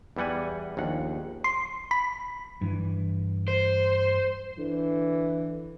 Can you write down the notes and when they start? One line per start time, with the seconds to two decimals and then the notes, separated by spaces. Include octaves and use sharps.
0.16 E2 E3 G3 F#5 G#5
0.77 A#1 D#2 F#5
1.44 C6
1.91 B5
2.61 G2 E3
3.48 C5
4.58 D3 E3